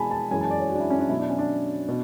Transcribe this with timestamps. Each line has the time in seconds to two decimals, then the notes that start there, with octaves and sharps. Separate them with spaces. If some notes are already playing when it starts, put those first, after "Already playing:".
Already playing: B2 G#3 G#5 A5 B5
0.11 A5
0.31 F#2 E3 G#3 G#5
0.41 A5
0.50 D5
0.60 C#5
0.70 F#4
0.75 D4
0.80 E4
0.90 C#4
0.99 D4
1.09 B2 F#3 E4
1.20 D4
1.29 C#4
1.38 D4
1.88 B2